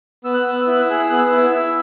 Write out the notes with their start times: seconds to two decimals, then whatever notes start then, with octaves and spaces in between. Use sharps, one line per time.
0.24 B3 E6
0.34 F#6
0.43 B3 E6
0.53 F#6
0.62 E6
0.67 E4 F#6
0.82 E6
0.89 G#4 F#6
0.99 E6
1.10 B3 F#6
1.19 E6
1.28 E4 F#6
1.37 E6
1.55 E4